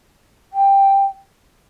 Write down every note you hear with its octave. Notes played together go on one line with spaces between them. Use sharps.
G5